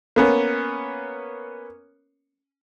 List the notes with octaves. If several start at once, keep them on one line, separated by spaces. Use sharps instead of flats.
A#3 B3 C#4